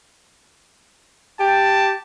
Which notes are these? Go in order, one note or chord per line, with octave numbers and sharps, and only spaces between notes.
G4 A5